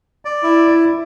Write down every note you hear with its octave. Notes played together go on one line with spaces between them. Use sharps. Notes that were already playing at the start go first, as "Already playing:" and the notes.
D5
E4